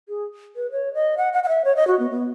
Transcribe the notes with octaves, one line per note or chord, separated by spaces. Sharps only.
G#4
B4
C#5
D#5
F#5
F#5
F#5
E5
C#5
D#5
F#4
B3
B3